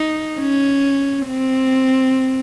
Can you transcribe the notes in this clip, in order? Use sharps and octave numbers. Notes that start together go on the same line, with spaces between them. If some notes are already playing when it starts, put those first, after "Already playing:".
Already playing: D#4
C#4
C4